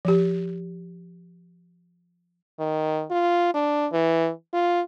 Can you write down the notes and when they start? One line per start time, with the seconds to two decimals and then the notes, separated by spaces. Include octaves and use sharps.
0.05 F3 G4
2.59 D#3
3.11 F4
3.54 D4
3.92 E3
4.53 F4